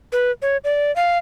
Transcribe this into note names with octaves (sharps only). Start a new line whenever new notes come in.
B4
C#5
D5
F5